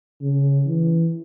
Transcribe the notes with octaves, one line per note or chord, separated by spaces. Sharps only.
C#3
E3